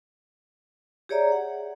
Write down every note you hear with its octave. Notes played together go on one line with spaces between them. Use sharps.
G4 G#4 C#5 D5 E5 A#5
F#5